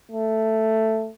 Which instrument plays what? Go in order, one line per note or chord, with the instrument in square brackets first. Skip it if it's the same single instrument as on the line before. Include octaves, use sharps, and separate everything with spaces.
[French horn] A3